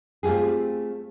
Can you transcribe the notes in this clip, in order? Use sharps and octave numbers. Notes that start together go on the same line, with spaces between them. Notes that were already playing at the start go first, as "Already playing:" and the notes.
A3 C4 F4 G4 G#4